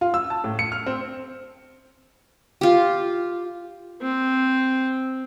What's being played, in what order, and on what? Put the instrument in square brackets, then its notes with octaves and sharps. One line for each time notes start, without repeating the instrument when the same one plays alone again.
[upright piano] F4
E6
A5
A2
C#7
F6
C4
[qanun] F4 G4
[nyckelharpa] C4